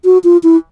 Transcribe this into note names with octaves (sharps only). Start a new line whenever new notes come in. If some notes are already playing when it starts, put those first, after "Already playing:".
F#4
F4
E4